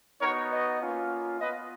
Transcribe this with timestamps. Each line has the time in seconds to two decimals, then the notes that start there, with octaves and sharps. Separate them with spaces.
0.21 B3 D#4 F#4 A#4 C#5
0.51 B4 D#5
0.81 A#3 C#4 F4
1.39 B3 F4 B4 D#5